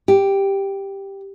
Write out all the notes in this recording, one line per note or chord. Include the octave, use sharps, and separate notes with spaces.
G4